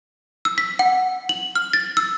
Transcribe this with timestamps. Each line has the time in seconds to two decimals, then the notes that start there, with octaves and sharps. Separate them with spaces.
0.45 E6
0.58 B6
0.79 F#5
1.29 F#7
1.55 F6
1.73 A6
1.97 E6